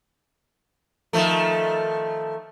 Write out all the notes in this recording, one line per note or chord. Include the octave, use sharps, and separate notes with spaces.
D#3 F3 A3